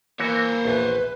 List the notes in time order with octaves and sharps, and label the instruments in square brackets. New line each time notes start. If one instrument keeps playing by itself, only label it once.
[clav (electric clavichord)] E3 F#4 [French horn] A#3 [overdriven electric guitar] C5 C#5
[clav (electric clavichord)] A#1 E2 [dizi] B4